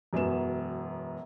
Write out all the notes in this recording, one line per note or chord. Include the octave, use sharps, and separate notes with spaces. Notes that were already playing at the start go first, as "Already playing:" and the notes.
E1 F#2 B3 E7